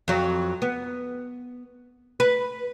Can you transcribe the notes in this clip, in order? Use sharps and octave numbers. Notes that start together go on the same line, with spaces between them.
F2 F#3
B3
B4